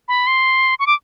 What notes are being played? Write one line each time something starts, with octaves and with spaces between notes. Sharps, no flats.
B5
C6
C#6
D6